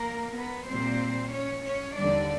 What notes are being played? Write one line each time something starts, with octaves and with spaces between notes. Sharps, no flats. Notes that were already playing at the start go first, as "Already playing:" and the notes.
Already playing: A#3 A#4
B3 B4
A#2 G3 C4 C5
C#4 C#5
C#4 C#5
D#2 D3 G3 D4 D5